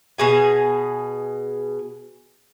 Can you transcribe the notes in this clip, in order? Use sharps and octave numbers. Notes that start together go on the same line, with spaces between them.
B2 G#4 G#5